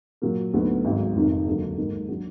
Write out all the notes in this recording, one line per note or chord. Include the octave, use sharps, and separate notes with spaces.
A#2 F#3 A#3
D2 D3 F#3 B3 D#4
G#1 G#2 F#3
F1 F2 D#3 A#3 D#4
D#2 D3 F#3 A#3
G#2 D#3 A#3
F#3 D4 F#4